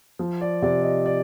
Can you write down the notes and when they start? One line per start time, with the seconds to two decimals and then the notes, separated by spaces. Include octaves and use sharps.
0.19 F3
0.41 D5
0.62 C3 D5
0.83 D#5
1.06 D5